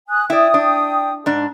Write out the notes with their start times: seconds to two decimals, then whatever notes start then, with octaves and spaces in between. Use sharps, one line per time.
0.09 G#5 D#6 F#6
0.30 E4 D5 G5 D#6
0.54 D4
1.26 G#2 D4